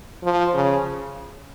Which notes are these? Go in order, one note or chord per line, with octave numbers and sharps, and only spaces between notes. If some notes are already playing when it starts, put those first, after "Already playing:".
F3
C#3